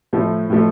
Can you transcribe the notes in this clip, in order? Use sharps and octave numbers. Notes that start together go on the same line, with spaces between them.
A2 F3 A3
A2 F3 A3